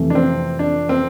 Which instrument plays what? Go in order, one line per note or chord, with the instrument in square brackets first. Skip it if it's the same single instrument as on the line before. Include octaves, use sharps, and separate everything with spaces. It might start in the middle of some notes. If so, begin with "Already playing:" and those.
Already playing: [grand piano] F2 C3 E3 A3
[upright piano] D4
C4
D4
C4